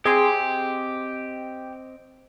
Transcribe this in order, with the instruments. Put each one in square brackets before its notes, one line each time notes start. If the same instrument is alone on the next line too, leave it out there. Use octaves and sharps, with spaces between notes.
[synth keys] C4 D#5 [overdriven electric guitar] G4 [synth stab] G#4 G#5 C6